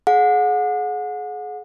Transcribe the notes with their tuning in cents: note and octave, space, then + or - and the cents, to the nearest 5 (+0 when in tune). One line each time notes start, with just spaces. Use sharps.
G#4 +35 F#5 -35